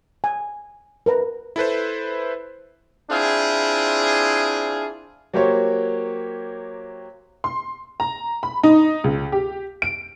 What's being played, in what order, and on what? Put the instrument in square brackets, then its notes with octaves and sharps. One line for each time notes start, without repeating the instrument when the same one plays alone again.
[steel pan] G#5
A#4 B4 A#5
[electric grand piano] E4 A4 B4 C5
[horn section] C4 D4 E4 F4 G#4
[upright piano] F#3 A#3 G4 C5 C#5
[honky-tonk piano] C6
A#5
B5
D#4
C#2
G4
D7